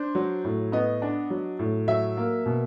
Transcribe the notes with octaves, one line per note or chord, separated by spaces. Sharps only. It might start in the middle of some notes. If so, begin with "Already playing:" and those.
Already playing: D4 C5
F#3
A2
B3 D#5
D4
F#3
A2
F#3 E5
A#3
B2